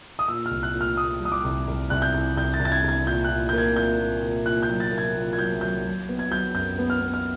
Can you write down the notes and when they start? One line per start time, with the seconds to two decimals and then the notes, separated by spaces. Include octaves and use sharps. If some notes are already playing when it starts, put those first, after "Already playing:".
0.19 D#6
0.28 A#2 E6
0.46 F6
0.51 C2
0.63 F#6
0.74 A#2
0.81 F6
0.97 A#2 D#6
1.20 G3
1.25 D#6
1.32 D6
1.44 C2
1.68 C2
1.90 C2 F#6
2.02 G6
2.14 C2
2.37 C2 G6
2.54 A6
2.60 C2
2.65 A6
2.72 G#6
2.84 C2 G#6
3.06 A#2 G6
3.24 A#2 F#6
3.49 A#3 G6
3.58 G#6
3.76 A#2 G6
3.99 A#2
4.22 A#2
4.45 A#2 F#6
4.63 G6
4.69 F#3
4.80 A6
4.92 A#3
4.98 G#6
5.16 A#2
5.33 G#6
5.38 F#3 G6
5.61 F#3 G6
5.85 F#3
6.09 B3
6.19 G#6
6.31 F#3 G6
6.55 F#2 G6
6.79 B3
6.90 F6
7.01 B3
7.14 F6